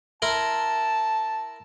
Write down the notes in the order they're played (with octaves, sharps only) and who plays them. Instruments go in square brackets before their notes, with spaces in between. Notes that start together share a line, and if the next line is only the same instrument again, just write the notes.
[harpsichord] E4 A#4 C6 [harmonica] A5